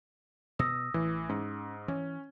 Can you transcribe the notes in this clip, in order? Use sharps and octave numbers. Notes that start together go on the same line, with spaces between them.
B2 D#6 E6 A#6
A1 E3
G#2 C#4
E3 C#4